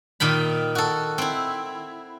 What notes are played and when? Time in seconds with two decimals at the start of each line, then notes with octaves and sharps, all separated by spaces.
0.20 A#2 D#3 G5 B5
0.75 F#4 A4
1.18 C4 E4